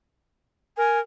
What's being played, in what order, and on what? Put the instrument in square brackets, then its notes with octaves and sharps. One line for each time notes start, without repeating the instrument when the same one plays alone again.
[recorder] A#4 [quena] G#5